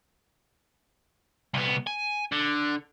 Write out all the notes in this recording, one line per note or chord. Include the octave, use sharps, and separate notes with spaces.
C2 B3
G#5
D3